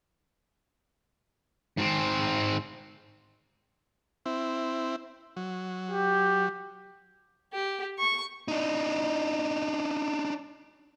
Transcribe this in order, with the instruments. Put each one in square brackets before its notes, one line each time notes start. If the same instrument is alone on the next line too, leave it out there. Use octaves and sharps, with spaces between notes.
[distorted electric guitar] G#2 C4
[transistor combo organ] C4 E4
F#3
[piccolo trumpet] G4
[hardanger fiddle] G4
C#6
[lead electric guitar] D4 D#4